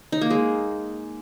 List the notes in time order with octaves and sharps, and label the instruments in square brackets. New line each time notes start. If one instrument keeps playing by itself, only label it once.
[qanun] D#4
A#3
G#3